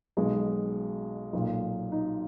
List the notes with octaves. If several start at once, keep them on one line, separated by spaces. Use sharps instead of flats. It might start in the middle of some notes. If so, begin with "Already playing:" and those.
B1 B2 G#3
B1 A#2
D#4